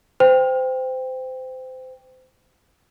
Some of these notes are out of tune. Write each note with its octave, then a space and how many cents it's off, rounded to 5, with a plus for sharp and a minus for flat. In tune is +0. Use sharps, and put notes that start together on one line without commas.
C5 -25 G5 +10